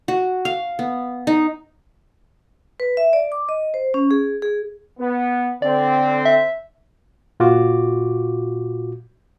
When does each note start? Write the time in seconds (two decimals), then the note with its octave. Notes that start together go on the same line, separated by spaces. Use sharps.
0.08 F#4
0.45 F5
0.79 B3
1.27 D#4
2.80 B4
2.97 E5
3.13 D5
3.32 D6
3.49 D#5
3.74 C5
3.94 C#4
4.11 G#4
4.42 G#4
4.99 B3
5.62 D3 C4 D5
6.25 E5
7.40 A#2 F4 F#4 D6